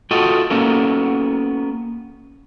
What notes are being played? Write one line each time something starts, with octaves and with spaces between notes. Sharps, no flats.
F4 F#4 A4 D#5 F#5 G5
A#3 B3 C#4 F#4 A4 A#4